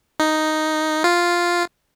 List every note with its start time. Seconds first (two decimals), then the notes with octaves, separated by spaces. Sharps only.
0.20 D#4
1.04 F4